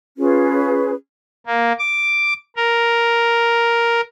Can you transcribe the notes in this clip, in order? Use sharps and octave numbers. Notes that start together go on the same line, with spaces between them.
C#4 F4 G#4 B4
A#3
D6
A#4